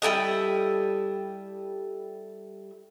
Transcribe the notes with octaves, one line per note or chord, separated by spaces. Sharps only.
G3 E4 A4 D#5